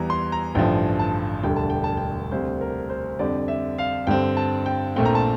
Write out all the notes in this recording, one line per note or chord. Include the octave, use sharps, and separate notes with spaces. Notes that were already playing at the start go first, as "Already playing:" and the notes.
Already playing: E2 E3 G3 A#5
C6
A#5
A1 G2 D3 F3 G5
A5
E1 D2 D3 G3 G5
A5
G5
A5
G5
D2 C3 G3 C5
A#4
C5
F2 D3 G3 D5
E5
F5
G2 D3 G3 C4 G5
A5
G5
A#1 A#2 A3 C4 G5
A#5
A5